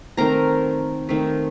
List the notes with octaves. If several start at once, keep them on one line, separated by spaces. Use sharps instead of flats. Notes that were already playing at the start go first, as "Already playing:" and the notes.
D#3 A3 C4 A#4 A#5
D#3 A3 C4